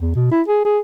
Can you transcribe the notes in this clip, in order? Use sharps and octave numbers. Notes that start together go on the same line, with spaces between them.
E2
B2
E4
G#4
G#4